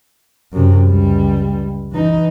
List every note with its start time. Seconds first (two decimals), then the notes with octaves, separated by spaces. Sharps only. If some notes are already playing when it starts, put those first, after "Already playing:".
0.52 F#2 C3
0.87 C#2 G3
1.93 E3 D#4